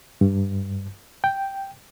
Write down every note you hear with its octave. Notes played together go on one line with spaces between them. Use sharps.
G2
G5